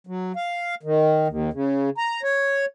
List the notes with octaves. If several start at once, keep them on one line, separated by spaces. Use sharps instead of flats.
F#3
F5
D#3
D#2
C#3
A#5
C#5